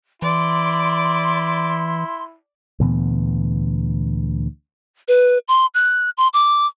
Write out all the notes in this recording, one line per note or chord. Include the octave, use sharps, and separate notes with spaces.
E3 E4 D5 C6
D2 A#2 E3 B3
B4
C6
F#6
C6
D6